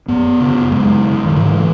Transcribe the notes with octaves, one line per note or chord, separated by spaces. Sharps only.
F#2 B3
C#3
F#2 G#3
C#3
D#3
G#2 E3